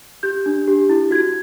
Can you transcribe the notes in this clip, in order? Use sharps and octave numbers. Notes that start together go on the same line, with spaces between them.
G4 G6
D4
G4
E4
F#4 G#6